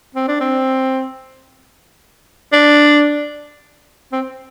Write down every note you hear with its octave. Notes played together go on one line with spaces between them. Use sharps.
C4
D4
C4
D4
C4